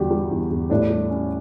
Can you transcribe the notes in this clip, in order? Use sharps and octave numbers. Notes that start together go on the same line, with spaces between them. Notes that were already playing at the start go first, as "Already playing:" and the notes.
Already playing: E2 D3 G3 F#4 G4 D5
G3
E2
E2
A2 D4
G3
C#4